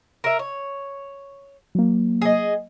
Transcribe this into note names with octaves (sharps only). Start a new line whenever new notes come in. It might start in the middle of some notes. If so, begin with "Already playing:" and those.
A#4 E5
C#5
F#3 A#3
G#4 D#5